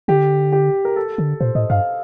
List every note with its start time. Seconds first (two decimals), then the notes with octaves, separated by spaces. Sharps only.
0.08 D3 G4
0.52 G4
0.85 A#4
0.96 A4
1.18 D3
1.40 A#2 C5
1.55 A2 D#5
1.70 G2 F5